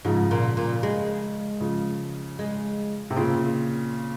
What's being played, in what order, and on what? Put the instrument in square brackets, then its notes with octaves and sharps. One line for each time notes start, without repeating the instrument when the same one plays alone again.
[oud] G#2 [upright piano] C#3 F3
[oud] A#2
A#2
G#3
[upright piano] C#3 F3
[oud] G#3
[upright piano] C3
[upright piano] A#2 C#3 [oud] C4